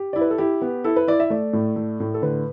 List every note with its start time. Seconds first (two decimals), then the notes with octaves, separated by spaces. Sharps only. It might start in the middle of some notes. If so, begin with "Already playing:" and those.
Already playing: G4
0.13 E4 D5
0.21 B4
0.31 A4
0.38 E4 G4
0.62 B3
0.84 E4 A4
0.96 B4
1.08 E4 D5
1.20 E5
1.30 A3 D5
1.53 A2
1.76 A3
2.00 A2
2.14 A4
2.22 D3 B4